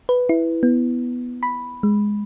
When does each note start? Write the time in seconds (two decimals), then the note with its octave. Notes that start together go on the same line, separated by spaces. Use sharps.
0.09 B4
0.29 E4
0.63 B3
1.43 B5
1.83 G#3